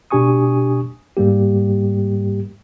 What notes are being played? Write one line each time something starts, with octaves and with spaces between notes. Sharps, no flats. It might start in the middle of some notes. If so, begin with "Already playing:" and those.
B2 D4 G4 G#5 C#6 D#6
G#2 G3 A#3 G4